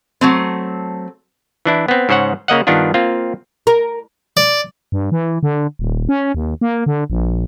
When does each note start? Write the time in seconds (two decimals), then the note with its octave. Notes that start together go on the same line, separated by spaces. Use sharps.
0.21 F#3 A3 C4
1.65 E3 D4 E4
1.88 B3 C4
2.09 G#2 C#3 C5 C#5 F#5
2.48 C#3 A#3 D#5 F#5
2.67 G2 D#3 B3 D4 F4
2.94 A#3 C4 F4
3.67 A#4
4.37 D5
4.92 G2
5.12 E3
5.43 D3
5.79 D#1
6.09 C#4
6.35 D#2
6.61 A#3
6.86 D3
7.10 A#1